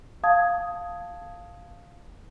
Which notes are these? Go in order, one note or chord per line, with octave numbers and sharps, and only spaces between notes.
F5 A5 D#6 G#6